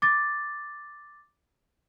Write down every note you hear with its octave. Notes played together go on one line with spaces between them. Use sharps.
D6 A6